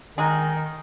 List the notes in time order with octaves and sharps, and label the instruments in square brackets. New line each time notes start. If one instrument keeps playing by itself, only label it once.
[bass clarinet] D#3 [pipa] G#3 D#4 G#4